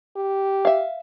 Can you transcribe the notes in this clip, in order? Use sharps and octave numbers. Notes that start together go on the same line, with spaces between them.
G4
E5 F5